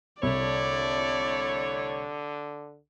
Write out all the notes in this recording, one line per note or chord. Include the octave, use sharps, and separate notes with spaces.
C2 D3 A3 E4 C#5 D5